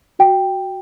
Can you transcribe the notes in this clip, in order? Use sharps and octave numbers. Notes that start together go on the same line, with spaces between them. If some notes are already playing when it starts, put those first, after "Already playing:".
F#4 G5